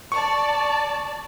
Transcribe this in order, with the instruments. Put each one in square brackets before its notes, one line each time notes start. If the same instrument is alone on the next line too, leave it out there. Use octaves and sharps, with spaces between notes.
[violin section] D5 A5 [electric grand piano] C#6